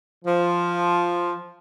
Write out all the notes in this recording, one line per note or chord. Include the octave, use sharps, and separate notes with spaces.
F3